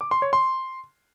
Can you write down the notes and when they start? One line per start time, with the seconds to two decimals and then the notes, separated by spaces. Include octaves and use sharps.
0.01 D6
0.11 C6
0.22 C#5
0.33 C6